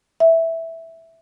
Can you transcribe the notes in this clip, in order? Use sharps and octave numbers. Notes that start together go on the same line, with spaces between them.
E5